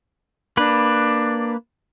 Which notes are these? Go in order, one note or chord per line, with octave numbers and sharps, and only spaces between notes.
A#3 D4 B4